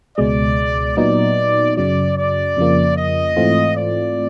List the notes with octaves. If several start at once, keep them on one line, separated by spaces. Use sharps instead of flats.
C#2 B2 G#3 D5
A#2 F#3 B3 D#4 D5
F#2 C#3 F#3 D5
D5
F2 C#3 F3 A#3
D#5
G#2 E3 A3 C4 F4
D5